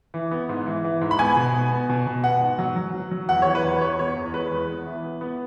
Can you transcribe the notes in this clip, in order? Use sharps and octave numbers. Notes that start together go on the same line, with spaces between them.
E3
B3
G#2
E3
E3
G#2
B5
B3 G#5
B2
B3
B3
B2
B2
B3 F#5
G#2
F#3
F#3
F#3
F#3
E2 F#5
E3 C#5
B4
E2 C#5
B3 C#5
E2 C#5
E2
G#3 B4
E2
B3
E3
B3
B3